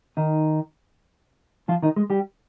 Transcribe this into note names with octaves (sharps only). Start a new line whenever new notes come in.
D#3 D#4
F3 F4
D#3 D#4
G#3
G3 G4